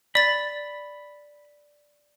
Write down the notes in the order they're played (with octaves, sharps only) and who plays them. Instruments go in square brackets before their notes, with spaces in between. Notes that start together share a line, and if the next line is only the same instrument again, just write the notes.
[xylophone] D5 A6 [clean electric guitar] B5